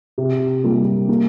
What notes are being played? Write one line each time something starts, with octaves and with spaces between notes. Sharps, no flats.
C3
G3 A#3 F4
A#3